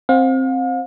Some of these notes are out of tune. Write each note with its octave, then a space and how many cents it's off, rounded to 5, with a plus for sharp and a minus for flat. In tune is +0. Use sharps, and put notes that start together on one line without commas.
C4 +10 F5 +40